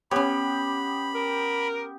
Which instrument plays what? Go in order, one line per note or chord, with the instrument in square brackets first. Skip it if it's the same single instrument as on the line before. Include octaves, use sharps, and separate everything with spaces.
[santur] B3 G4 [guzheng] C#4 C#5 [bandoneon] B5
[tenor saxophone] A#4